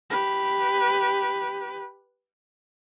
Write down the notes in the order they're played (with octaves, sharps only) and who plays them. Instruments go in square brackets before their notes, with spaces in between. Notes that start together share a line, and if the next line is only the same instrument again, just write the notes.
[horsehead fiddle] G4 B4